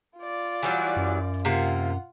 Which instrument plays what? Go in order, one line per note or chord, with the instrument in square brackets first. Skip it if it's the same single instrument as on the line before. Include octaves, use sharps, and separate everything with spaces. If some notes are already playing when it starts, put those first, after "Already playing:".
[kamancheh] F4 D5
[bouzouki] E3 F#3 G3
[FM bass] F#2
[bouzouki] C3 A#3 [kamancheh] F4 F#5